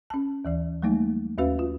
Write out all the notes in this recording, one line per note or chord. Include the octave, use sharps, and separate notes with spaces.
C#4 A5
D#2 E3 D5
F#3 G3 A3 A#3 D#4
D#2 C#4 F#4 B4 F5
F4